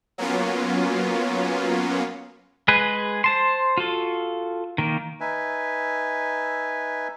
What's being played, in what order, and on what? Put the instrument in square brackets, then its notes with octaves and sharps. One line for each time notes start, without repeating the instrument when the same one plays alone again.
[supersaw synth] F#3 A#3 B3 C#4 F4
[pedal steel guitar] G#3 G#4 B4
C5 A5 C6
F4 F#4 A4
D#3 A#3
[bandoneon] D#4 B4 E5 G#5